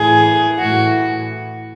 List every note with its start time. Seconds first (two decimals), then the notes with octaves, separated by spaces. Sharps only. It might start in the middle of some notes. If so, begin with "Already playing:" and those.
Already playing: A2 E3 G#4
0.58 A2 E3 F#4